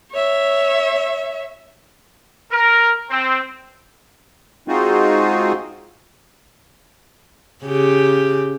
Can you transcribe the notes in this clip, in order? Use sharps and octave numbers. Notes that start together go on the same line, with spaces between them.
C#5 E5
A#4
C4
G#3 C4 D#4 F4 F#4 G#4
C#3 G4